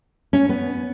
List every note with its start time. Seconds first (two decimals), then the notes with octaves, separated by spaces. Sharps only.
0.33 C#4
0.49 B3